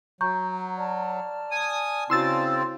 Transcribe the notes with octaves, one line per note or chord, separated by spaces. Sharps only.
F#3 A#5 C#6 G6
D5 A5 F6
G#5 D#6
C#3 C4 E4 F#4 C6 E6 A6